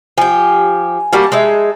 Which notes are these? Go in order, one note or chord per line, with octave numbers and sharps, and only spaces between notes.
F3 G4 G#5
G3 A#3 F#4 A5 A#5
G#3 D#4 E5